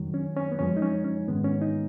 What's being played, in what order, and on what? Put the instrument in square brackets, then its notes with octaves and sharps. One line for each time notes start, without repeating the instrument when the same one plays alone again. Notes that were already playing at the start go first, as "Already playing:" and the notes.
Already playing: [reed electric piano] F#2 D#3 F#3
C#4
C#4
B3
F#2 F3 G#3 C#4
D#4
C#4
C#4
G#2 D#3 G#3 B3
C#4
D#4